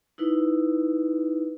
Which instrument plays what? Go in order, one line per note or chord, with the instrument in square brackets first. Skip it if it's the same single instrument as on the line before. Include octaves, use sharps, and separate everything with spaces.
[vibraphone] D#4 E4 B4